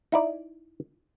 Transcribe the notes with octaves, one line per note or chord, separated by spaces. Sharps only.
D#4 E4 D5